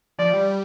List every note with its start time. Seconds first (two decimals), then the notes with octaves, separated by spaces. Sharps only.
0.19 F3 D5
0.33 G3